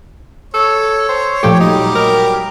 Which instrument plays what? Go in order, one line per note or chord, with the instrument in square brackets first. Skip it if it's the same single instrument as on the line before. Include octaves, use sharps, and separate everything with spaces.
[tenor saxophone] A4 [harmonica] C#5
[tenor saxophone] C5
[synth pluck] A#2 F3 A3 [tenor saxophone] G4
[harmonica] F#3 G3 G4 [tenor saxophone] D#4
[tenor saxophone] A#4